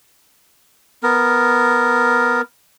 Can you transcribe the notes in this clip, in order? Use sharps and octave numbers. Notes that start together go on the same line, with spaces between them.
B3 A#4